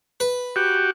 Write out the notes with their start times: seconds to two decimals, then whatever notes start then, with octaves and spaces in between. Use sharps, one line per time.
0.20 B4
0.56 F#4 G4